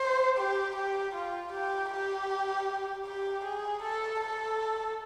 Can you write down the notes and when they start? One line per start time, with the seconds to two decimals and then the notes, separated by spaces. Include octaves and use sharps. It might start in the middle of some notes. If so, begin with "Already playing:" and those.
Already playing: C5
0.37 G4
0.75 G4
1.15 F4
1.52 G4
1.90 G4
3.05 G4
3.44 G#4
3.82 A4
4.20 A4